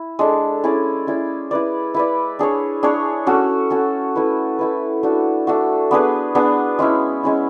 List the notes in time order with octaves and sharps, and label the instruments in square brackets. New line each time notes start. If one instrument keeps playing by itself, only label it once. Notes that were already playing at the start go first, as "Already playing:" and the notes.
Already playing: [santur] E4
G#3 D4 A4
C#4 E4 G#4 D5
C#4 E4 G#4 D5
E4 B4 D5
E4 B4 D5
D4 G#4 C#5
D4 G#4 C#5
C#4 F#4 A4
C#4 F#4 A4
A3 E4 B4
A3 E4 B4
A3 D4 F#4
A3 D4 F#4
B3 D4 G#4 B4
B3 D4 G#4 B4
G#3 C#4 E4
G#3 C#4 E4